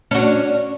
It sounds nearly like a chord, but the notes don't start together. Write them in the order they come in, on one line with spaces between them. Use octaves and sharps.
C#4 F#4 D4